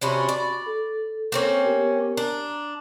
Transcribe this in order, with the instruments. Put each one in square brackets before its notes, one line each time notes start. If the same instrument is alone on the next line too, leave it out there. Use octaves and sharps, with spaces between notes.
[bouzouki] C3 C#4 D4 [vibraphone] F#4 B5 C#6
[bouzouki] D5
[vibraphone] A4
[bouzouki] A#3 C4 C#4
[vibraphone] B3 G4 A#4
[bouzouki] D4 [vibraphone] A#5